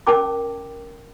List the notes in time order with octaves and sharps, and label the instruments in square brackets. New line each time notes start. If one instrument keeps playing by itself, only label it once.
[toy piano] C#4 A#4 G5 A5 D6